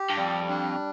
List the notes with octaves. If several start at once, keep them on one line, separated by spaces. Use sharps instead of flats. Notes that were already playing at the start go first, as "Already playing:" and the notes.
Already playing: G4
G2
F2 G3
D4